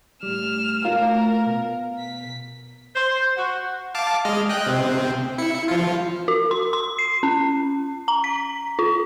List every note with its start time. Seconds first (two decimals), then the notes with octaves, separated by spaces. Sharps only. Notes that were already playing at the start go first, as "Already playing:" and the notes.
0.23 A2 G3 F6 E7
0.85 A3 F4 F#4 A#4 C#5
1.46 B2
2.00 B6
2.95 C5
3.37 F#4
3.95 F5 A5 D6
4.25 G#3 D#5 F6
4.49 D#5 G5 F#6
4.67 C3 C4
5.38 E4 C#7
5.68 F3 F4
6.28 F#4
6.51 C6
6.73 C6
6.98 C7
7.23 C#4
8.08 A#5
8.24 B6
8.79 F4